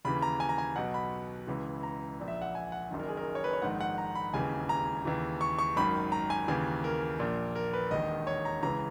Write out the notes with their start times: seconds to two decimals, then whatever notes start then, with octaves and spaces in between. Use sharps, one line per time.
0.05 D#2 C#3 E3 B5
0.22 A#5
0.40 G#5
0.49 A#5
0.58 G#5
0.76 B1 B2 F#5
0.94 B5
1.47 C#2 C#3 E3
1.83 A#5
2.19 A#1 A#2
2.28 E5
2.42 F#5
2.55 G#5
2.72 F#5
2.91 F#1 F#2 D#3
2.99 A#4
3.09 G#4
3.17 A#4
3.35 C#5
3.44 B4
3.53 C#5
3.62 A#1 G#2 D#3 F#5
3.81 F#5
3.98 A#5
4.15 B5
4.34 E1 D#2 C#3 E3 G#5
4.69 A#5
5.05 D#2 C#3 E3
5.41 C#6
5.59 C#6
5.76 G#1 F#2 D#3 B5
6.12 A#5
6.30 G#5
6.48 D#2 C#3 E3 G#5
6.84 A#4
7.19 A#1 A#2
7.55 A#4
7.73 B4
7.91 E1 D#2 D#3 D#5
8.27 C#5
8.45 A#5
8.63 C#2 C#3 E3 A#5